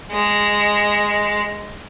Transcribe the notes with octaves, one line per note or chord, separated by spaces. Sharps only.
G#3 D#5